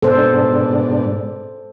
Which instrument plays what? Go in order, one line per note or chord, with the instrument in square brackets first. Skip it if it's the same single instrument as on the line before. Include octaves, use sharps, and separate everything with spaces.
[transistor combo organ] G#2 B2 D4 [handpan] A4 C5